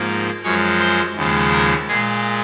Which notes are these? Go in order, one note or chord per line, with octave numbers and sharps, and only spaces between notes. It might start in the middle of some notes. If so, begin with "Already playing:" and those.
Already playing: G#2 F3 A#3
F#2 F3 G#3 C#5
C5
D#2 C#3 F3 G#3
A#4
A#2 G#3 G#4